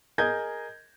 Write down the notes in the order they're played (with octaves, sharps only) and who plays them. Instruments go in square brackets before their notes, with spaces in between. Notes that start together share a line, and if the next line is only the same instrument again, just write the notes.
[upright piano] G#4 A#4 D#5 G6 G#6